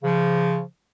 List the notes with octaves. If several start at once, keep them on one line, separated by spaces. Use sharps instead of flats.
C#3 F3